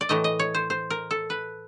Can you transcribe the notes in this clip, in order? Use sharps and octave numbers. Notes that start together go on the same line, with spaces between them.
D5
A2 E3 A3 D#5
D#5
C#5
C5
C5
A#4
A4
B4